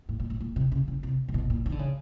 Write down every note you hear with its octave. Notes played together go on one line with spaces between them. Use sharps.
A2
A#2
A2
A#2
C3
C#3
C#3
C3
C3
B2
A#2
D#3
D3
C#3